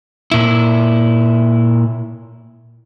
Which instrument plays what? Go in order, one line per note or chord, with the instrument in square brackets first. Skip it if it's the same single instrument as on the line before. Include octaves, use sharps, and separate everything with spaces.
[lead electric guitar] A#2 E4